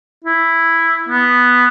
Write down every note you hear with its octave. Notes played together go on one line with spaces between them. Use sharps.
E4
B3